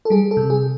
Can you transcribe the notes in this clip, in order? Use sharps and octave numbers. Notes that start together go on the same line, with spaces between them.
A4
G3 G#4
A4
C3
G#4